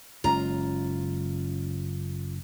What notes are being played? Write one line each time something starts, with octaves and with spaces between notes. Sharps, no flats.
F#1 G#3 C#4 F4 A#5